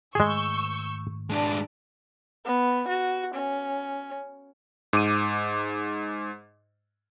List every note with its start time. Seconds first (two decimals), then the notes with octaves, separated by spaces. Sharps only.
0.15 G#2 D#3 G#3 A3 G#4 C#6 E6 G6
1.30 G#3 D4 D5 A5
2.46 B3
2.88 F#4
3.34 C#4
4.93 G#2 D6 D#7